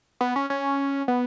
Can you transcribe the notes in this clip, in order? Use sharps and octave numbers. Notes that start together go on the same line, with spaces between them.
B3
C#4
C#4
B3